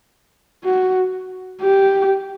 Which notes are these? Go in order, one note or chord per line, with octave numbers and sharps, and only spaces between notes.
F#4
G4